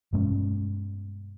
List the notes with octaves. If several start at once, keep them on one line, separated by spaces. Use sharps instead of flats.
G2 B2 G#3 C#4